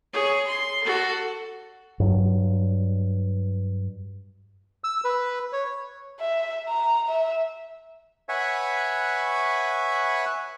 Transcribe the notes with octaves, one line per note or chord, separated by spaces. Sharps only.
G#4 C#5
C6
F#4 A4
G2 F#3
E6
B4
C#5
E5
A#5
E5
B4 C#5 E5 F#5 G#5 B5